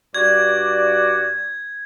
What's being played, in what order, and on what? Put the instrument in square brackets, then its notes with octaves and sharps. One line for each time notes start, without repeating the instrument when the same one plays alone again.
[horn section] G2 F#4 D5 [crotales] G#6